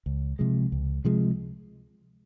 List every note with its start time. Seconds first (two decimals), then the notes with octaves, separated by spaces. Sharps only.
0.06 C#2
0.39 C3 F3 G#3
0.72 C#2
1.05 C3 F3 G#3